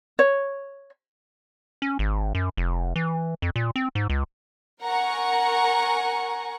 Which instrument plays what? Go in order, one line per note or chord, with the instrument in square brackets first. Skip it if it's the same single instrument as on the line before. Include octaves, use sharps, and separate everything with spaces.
[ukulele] C#5
[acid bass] C#4
G#1
F#2
F1
E3
F2
A#2
C4
G#2
C#2
[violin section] A#4 F#5 G#5 A#5 C#6